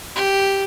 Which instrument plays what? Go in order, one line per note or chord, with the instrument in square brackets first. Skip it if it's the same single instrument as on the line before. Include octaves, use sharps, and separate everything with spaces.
[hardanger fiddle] G4